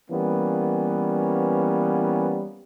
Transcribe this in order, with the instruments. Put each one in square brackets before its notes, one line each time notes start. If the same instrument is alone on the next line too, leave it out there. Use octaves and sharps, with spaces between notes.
[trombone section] E3 G3 A#3 B3 C#4